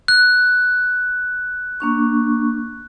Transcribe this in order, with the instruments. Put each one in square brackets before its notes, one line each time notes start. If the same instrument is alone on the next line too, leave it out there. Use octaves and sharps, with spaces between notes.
[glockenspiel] F#6
[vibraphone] A#3 D4 C#6